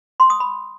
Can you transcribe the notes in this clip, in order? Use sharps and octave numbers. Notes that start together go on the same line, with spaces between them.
C6
D#6
B5